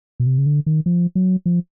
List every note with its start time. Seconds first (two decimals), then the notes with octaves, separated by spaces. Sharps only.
0.20 B2
0.27 C3
0.38 C#3
0.46 D3
0.66 D#3
0.86 F3
1.15 F#3
1.46 F3